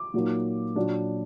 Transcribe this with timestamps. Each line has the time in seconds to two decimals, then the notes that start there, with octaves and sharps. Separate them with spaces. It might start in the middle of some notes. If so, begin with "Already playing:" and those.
Already playing: D6
0.14 A#2 F#3 A#3 D#4
0.76 A#2 F#3 D4